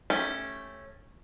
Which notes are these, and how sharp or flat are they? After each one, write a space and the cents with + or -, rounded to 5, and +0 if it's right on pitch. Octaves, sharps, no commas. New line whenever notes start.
A3 +0 C#4 -10 G4 +0